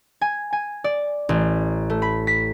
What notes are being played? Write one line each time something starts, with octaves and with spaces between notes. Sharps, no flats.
G#5
G#5
D5
A1
A3
B5
B6